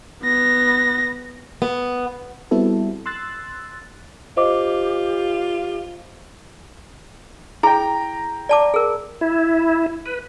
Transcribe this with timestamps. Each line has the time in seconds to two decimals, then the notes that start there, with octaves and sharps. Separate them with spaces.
0.23 B3 A#6
1.62 B3
2.51 G3 B3 C4 E4 F#4 A4
3.06 C6 E6 F#6 A6
4.37 F4 G4 C5 D#5 D6
7.63 E4 G#4 G5 A#5
8.49 D5 A5 D6
8.74 G#4 A#4
9.21 E4
10.06 B4